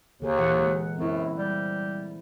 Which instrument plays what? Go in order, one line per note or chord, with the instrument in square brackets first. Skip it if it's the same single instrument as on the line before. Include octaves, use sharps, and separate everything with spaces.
[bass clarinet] D#2 [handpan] D3 G#4 A#4
[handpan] A#2 E3 F#5
G#3
[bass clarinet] F#2 [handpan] C4 E4
[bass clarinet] G3